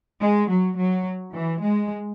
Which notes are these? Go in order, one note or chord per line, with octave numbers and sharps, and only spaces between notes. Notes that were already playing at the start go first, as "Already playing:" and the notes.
G#3
F#3
F#3
E3
G#3